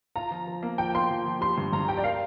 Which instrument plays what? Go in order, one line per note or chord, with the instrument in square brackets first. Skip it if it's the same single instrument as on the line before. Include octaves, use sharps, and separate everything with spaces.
[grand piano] F4 [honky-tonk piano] A#5
[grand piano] F3
F3
A#3
[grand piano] F3 [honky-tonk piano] G5
[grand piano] A#3 [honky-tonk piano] C6
[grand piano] F3
F3
[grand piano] G4 [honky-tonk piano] C6
[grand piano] G2
[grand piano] G2 [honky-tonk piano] A#5
[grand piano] G4 [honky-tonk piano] G5
[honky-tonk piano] D5
[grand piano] A#4 [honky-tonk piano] F5